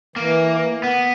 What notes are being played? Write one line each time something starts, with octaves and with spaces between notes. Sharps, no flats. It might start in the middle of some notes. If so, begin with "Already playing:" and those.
E3 A#3
B3